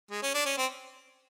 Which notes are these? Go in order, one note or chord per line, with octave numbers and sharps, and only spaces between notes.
G#3
C#4
D4
C#4
C4